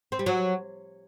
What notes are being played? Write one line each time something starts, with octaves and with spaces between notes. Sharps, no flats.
C4
G3
F#3